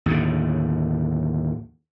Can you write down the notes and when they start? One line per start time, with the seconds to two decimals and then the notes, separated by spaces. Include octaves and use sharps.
0.06 D#2 A2 D3